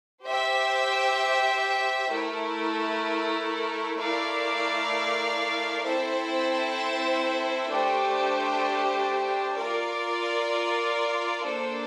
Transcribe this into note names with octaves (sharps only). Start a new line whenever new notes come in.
G4 C5 E5 G5
A3 E4 A#4
A3 E4 A#4 D5 F5
C4 E4 A4 C5 E5
A3 D4 G4 C5
F4 A#4 D5
A#3 D4 A4 C5